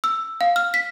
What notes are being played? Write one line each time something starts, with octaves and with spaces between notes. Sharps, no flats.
E6
F5
F6
B6